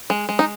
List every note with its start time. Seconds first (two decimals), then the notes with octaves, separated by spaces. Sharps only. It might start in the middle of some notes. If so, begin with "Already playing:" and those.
0.10 G#3
0.29 G#3
0.39 D#4